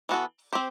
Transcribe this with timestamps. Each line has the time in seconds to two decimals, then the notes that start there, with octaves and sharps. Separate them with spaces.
0.09 E3 B3 F#4 A4
0.53 C4 G4 C5